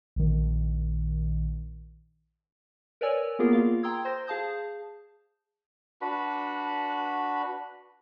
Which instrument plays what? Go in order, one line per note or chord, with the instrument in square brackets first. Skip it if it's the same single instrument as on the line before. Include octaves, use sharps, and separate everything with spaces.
[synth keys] A#1 D#3
[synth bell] A#4 B4 C#5 D5 G#5 E6
A#3 B3 F4 G#4 A#4
F4 F5
G5 A#5 C6 D#6 E6 G#6
C5 C6 G6 A#6
G#4 F5 A5 D#6 G6
[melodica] D4 F#4 B4 B5